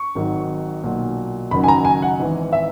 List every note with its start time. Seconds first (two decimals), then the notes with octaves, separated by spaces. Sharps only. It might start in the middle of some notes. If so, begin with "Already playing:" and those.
Already playing: C#6
0.15 G#1 G#2 D#3 F#3
0.83 B1 A#2 F#3
1.51 F#1 F#2 D#3 F#3 B5
1.64 G#5
1.68 A#5
1.85 G#5
2.02 F#5
2.19 G#1 G#2 E3
2.53 E5